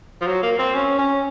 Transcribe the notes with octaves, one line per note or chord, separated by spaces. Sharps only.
F3
F#3
A#3
C4
C#4
C#4